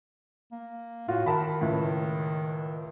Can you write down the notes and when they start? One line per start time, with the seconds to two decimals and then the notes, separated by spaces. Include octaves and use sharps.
0.52 A#3
1.08 A2 F4 F#4
1.26 D#3 A#4 A5 B5
1.61 C#2 A2